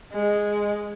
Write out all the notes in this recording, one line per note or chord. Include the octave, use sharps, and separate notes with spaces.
G#3